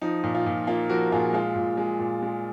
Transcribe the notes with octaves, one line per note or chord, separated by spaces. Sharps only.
F3 D#4
A#2
F4
A#2
A#3 F4
F3 F#4 A#4
A#2 F4 G#4
G#3 F4
A#2
G#3
A#2
G#3